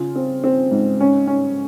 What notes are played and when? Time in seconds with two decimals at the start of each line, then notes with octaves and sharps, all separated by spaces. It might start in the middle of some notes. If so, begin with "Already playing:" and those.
Already playing: C#3 F4
0.16 C4
0.44 C4
0.71 G#2
1.00 C#4
1.27 C#4